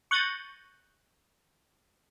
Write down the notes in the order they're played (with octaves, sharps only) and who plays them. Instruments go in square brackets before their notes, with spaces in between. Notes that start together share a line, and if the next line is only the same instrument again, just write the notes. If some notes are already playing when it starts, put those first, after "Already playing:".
[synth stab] C#6 F#6 G6 A6 A#6 D#7